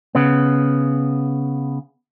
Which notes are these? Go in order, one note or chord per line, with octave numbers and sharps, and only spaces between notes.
C#3 B3